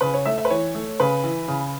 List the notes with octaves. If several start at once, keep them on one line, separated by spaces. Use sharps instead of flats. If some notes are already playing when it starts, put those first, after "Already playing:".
C#3 B4
C#5
A3 E5
E5
B4
E3 C#5
A3
C#3 B4
E3
C#3